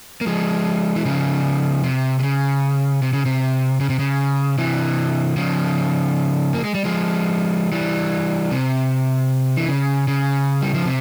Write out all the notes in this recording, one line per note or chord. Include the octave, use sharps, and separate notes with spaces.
A#3
F3 G#3
E3
C#3 F3
C3
C3
C#3
C3
C#3
C3
C#3
C3
C#3
C3 E3
C#3 F3
A#3
G#3
G3
F3 G#3
E3 G3
C3
E3
C#3
C#3
G3
F3
C3